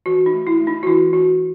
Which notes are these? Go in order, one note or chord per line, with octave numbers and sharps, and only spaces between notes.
E3 F#4
D#4
A3
E4
A3
D#4
F#4
E3 E4
E3 F#4